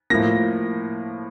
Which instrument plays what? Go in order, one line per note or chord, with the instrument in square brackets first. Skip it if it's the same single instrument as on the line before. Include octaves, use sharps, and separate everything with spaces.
[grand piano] A2 F3 A#3 A#6